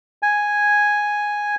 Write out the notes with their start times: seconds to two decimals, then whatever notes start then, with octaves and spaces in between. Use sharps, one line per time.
0.23 G#5